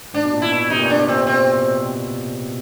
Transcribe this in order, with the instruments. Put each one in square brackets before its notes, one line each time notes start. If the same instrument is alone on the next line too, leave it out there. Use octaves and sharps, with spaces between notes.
[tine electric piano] G#2 [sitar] D4
[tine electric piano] B2
A#2
[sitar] E4
[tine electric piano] B2
[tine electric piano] C3 [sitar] D#4
[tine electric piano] A#2
B2
[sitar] D4
[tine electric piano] A#2
[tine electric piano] C3 [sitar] C4
[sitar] C4